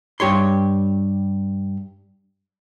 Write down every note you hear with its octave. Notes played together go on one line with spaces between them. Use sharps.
G2 G4 C#5 C6